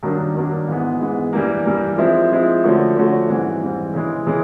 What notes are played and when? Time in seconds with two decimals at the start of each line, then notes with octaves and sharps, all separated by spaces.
0.03 G2 D#3 F#3 A#3 D4
0.35 G2 D#3 F#3 A#3 D4
0.68 G#2 E3 G#3 B3
1.00 G#2 E3 G#3 B3
1.33 G2 E3 G3 A#3
1.66 G2 E3 G3 A#3
1.98 F3 G#3 C4 E4
2.32 F3 G#3 C4 E4
2.64 D3 F3 A3 C#4 F#4
2.97 D3 F3 A3 C#4 F#4
3.29 G#2 E3 G3 C4
3.62 G#2 E3 G3 C4
3.94 C#3 E3 G#3
4.27 C#3 E3 G#3